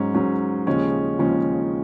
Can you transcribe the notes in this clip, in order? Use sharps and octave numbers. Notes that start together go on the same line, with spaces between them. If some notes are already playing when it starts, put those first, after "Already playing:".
Already playing: G#2 F#3 C#4
G#2 F#3 C#4
D#2 C#3 F3 G#3 C#4
D#2 C#3 F3 G#3 C#4